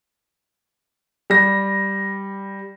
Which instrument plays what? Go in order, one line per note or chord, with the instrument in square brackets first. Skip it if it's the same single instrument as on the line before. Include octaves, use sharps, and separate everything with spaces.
[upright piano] G3 A#6